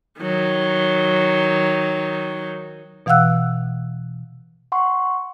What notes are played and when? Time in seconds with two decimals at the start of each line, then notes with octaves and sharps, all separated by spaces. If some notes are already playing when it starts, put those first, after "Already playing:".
0.20 D#3 F#3
3.06 B2 E3 F5 F#5 E6 F#6
4.72 F#5 C6 C#6